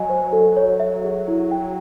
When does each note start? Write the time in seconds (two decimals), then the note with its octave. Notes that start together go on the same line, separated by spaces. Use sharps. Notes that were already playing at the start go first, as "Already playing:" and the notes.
Already playing: F#3 D#5 G#5
0.10 C5
0.33 A4
0.57 C#5
0.80 E5
1.04 G#4
1.28 E4
1.51 G5